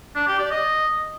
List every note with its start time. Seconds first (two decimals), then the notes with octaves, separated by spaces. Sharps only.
0.15 D4
0.27 G4
0.39 D5
0.51 D#5